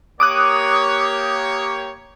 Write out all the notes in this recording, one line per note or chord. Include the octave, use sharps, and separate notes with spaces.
A#3 G4 C#5 D6 D#6 F#6